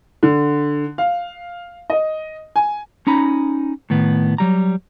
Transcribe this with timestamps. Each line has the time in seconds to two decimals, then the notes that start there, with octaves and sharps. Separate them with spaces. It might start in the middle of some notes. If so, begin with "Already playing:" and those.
0.23 D3
0.98 F5
1.90 D#5
2.56 G#5
3.07 C#4 D#4 A#5 B5
3.90 A2 D#3 B3
4.38 F#3 G3 A#5